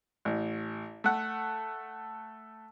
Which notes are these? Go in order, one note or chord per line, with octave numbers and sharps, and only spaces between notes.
A1
A3 F#5